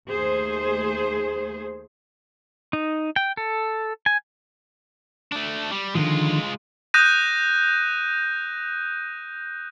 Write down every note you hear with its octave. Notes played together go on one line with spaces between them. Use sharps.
D#2 A3 G#4 C5
D#4
G5
A4
G#5
A3 D4
G3
D3 D#3 F3 G#3 F4
D#6 F#6 G6 A#6 D#7